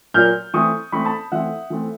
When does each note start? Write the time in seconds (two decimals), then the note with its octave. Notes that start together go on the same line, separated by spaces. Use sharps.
0.14 A#2 F#3 A#3 F6 G6
0.54 E3 A3 C4 C#6 D#6
0.92 E3 A3 C4 B5 C#6
1.05 A5 B5
1.32 E3 A3 C4 E5 F#5
1.70 E3 A3 C4